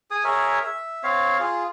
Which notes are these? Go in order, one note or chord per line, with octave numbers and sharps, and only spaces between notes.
G#4 G#5 D#6
G#4 A#4 C#5 E5
E5
C4 C#5 F5
F4 G#4